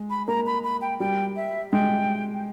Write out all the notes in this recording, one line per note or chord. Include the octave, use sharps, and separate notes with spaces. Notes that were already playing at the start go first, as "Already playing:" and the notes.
Already playing: G#3
B5
A#3 A#5
B5
B5
G5
G3 G5
E5
G#3 G5